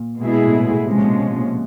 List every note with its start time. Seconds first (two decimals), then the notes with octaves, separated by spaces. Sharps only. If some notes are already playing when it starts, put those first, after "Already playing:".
Already playing: A#2
0.20 B2 G#3 B3 E4 G#4
0.46 A2
0.53 A#2
0.70 A2
0.86 C3 F3 G#3 C#4
0.98 A#2
1.03 B2
1.20 A#2
1.37 A#2